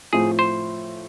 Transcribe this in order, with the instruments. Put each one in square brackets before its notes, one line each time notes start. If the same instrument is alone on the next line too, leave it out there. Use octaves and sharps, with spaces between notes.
[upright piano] A2 F3 A3 C4 F4 [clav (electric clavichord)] G#4
[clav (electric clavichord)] C5